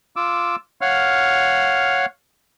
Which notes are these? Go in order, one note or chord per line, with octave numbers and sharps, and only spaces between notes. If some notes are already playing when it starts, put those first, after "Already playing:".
F4 D6 E6
C#5 F5 F#5 F6